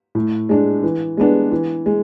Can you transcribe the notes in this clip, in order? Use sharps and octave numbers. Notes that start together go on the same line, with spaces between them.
A2
G#3 D4
E3
G#3 B3 D4
E3
G#3